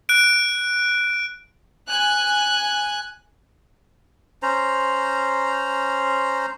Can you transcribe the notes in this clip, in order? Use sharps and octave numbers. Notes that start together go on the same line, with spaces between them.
F#6 D7
G#5 F#6
C#4 C5 A#5